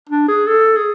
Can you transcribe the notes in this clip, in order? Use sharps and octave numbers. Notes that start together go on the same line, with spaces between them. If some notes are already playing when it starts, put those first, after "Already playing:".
D4
G#4
A4
G#4